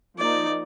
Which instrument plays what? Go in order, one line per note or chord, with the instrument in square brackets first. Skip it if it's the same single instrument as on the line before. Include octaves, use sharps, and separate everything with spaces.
[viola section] F3 A#3 D#4 [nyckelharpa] D5